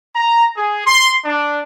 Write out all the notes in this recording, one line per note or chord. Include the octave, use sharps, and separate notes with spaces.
A#5
G#4
C6
D4